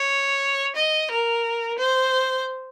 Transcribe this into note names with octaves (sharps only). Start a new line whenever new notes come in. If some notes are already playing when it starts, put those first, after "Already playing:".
Already playing: C#5
D#5
A#4
C5